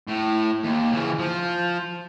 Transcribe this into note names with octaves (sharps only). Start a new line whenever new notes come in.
A2
D#2
C#3 E3
F3